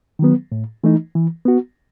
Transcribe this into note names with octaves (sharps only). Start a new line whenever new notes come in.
D#3 F#3 B3
A2
E3 A3 D#4
E3
B3 F#4